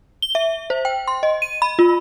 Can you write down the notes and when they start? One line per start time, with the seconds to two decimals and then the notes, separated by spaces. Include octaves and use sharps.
0.22 G7
0.35 E5
0.70 C5
0.85 G5
1.08 C6
1.23 D#5
1.42 D#7
1.62 B5
1.79 F4